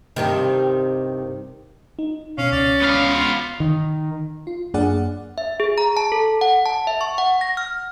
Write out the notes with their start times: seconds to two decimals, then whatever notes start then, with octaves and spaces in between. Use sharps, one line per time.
0.16 G2 C3 D#3
1.99 D#4
2.38 B2 C#4 F5
2.52 C#2 D5
2.82 B3 F5
3.06 F4
3.60 D#3
4.47 F4
4.74 F#2 A#3 D4 G#4 D5 F#5
5.38 E5
5.60 G#4
5.78 A#5
5.97 A5
6.12 A4
6.41 F#5
6.66 A5
6.87 E5
7.01 C#6
7.18 F#5
7.41 A#6
7.57 F6